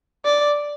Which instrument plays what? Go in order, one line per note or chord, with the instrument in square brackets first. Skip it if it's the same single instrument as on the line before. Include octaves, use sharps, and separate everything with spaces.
[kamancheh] D5